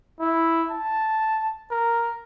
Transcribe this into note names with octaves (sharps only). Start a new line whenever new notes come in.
E4
A5
A#4